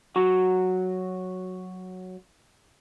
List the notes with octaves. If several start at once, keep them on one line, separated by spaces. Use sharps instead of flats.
F#3 F#4